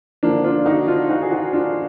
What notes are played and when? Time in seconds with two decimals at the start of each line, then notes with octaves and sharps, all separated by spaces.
0.23 D3 F3 A#3 D4
0.44 D4 F4
0.66 D#4 F#4
0.88 D4 F4
1.10 D#4 F#4
1.22 G#4
1.31 D#4 F#4
1.53 D4 F4